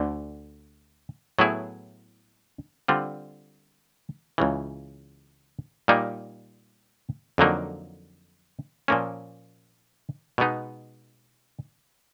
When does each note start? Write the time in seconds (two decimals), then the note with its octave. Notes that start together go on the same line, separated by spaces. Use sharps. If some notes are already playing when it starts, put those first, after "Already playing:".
Already playing: D2 D3
1.39 A2 F#3 B3 E4 G#4
2.88 D3 G3 C4 F4
4.38 C#2 C#3 E3
5.88 A#2 G3 A#3 D#4
7.38 F2 D3 F#3 A#3 D#4
8.88 A#2 F3 A#3 C#4
10.38 B2 G#3 B3 D#4